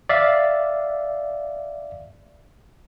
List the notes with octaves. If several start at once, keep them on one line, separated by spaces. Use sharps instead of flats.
D5 E5 F5